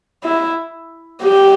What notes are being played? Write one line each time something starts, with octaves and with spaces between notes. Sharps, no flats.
E4
G4